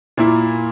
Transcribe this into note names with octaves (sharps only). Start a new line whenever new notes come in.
A#2 A#3 E4